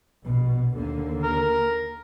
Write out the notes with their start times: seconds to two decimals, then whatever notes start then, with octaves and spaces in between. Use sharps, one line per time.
0.23 A#1 B2
0.74 D#2 D3 A#3
1.23 A#4